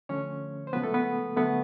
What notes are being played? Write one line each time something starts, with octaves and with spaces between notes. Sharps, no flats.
D3 F3 A3 C#4 C#5
C5
C#3 F3 G#3 B3 B4
A3 A4
B3 B4
D3 F#3 A3 B3 B4